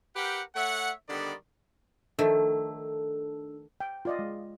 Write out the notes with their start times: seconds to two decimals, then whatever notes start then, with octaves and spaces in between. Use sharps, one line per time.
0.16 G4 A#4 B4 F#5 G5
0.54 A3 C#5 E5 F#5
1.09 D3 D#3 G3 B3 D5
2.19 D#3 F3 A3 D4 A4
3.80 G5
4.05 F4 D5 D#5
4.19 G#3